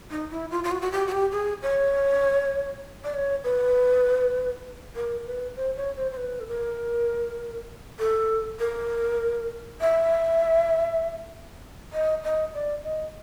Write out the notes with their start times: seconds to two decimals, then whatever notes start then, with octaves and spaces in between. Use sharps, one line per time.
0.11 D#4
0.31 E4
0.51 F4
0.64 F4
0.72 F#4
0.82 F#4
0.92 G4
1.07 F#4
1.12 G4
1.32 G#4
1.63 C#5
3.04 D5
3.14 C#5
3.44 B4
4.96 A#4
5.26 B4
5.56 C5
5.77 C#5
5.97 C5
6.12 C5
6.17 B4
6.40 A4
6.48 A#4
7.99 A4
8.59 A#4
9.81 E5
11.93 D#5
12.24 D#5
12.54 D5
12.84 D#5